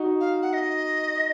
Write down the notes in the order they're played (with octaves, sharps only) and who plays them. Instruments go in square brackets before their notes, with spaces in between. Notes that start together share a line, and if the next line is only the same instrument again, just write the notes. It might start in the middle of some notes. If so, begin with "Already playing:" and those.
Already playing: [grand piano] D#4 F#4
[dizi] F5
F#5
D#5